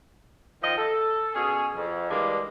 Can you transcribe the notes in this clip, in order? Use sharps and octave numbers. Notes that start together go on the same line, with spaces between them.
D#3 F3 D#5
A4
B2 C#4 G#4
F2
E3 G3 G#3 A#3 D4